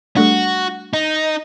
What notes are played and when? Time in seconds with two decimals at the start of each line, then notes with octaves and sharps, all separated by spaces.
0.17 G3 A3 D4 F#4
0.93 D#4